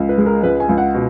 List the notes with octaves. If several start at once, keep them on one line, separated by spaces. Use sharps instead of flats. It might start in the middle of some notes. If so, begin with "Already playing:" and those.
Already playing: C#2
B4
G#3
A#4
C#2 B4
G#5
C#2
F#5
B2